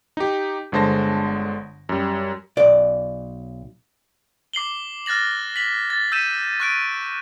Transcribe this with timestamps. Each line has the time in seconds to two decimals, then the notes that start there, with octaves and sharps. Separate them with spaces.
0.17 D#4 G4
0.72 G1 D3 G#3 C5 A5 A#6
1.89 F#2 G3
2.57 B1 D5
4.53 D6 C7 F#7 G7
5.06 F6 F#6 A6 A#6 F#7
5.56 B6 F#7
5.90 A6
6.12 E6 G6 B6 D#7 E7
6.60 C#6 F#6 D7